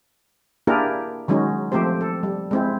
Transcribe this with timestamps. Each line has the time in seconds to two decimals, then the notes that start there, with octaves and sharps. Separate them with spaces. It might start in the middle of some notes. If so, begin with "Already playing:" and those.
0.67 A#3 D4 E4 G4 G#4 A#4
1.28 D#3 F#3 G#3 C#4 D#4
1.72 F3 A3 C4 G4 C5
2.01 A4
2.23 G3
2.51 G#3 C4 E4